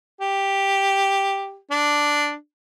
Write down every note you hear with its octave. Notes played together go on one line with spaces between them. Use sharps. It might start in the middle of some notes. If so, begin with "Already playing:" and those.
G4
D4